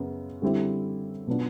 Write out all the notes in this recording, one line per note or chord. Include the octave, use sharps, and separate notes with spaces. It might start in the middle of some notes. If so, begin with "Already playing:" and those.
Already playing: F#2 C#3 B3
D3 G3 C4 E4 G4
B2 F#3 B3 D4 F4